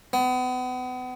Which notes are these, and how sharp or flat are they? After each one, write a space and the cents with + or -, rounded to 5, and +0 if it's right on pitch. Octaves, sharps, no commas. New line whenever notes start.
B3 +35